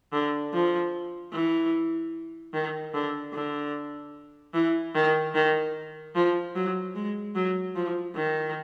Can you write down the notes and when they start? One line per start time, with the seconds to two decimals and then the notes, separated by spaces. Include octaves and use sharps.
0.13 D3
0.53 F3
1.32 E3
2.53 D#3
2.94 D3
3.33 D3
4.54 E3
4.95 D#3
5.35 D#3
6.15 F3
6.55 F#3
6.95 G#3
7.35 F#3
7.76 F3
8.15 D#3